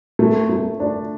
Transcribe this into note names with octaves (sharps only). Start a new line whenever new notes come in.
A3
A3
D4